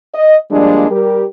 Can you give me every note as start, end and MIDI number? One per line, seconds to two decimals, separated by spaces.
0.15 0.37 75
0.51 0.87 53
0.51 0.87 55
0.51 0.87 56
0.51 0.87 58
0.51 0.87 62
0.90 1.24 55
0.90 1.24 67
0.90 1.24 70